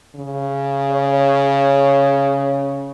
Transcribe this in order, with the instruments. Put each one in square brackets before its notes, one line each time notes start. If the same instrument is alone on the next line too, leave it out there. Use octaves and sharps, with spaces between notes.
[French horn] C#3
[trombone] C#5